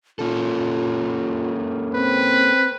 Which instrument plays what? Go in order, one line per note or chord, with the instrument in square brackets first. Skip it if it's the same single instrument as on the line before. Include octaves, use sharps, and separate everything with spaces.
[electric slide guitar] A#3 C#4 A4 [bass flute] F4
[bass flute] C4 [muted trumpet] B4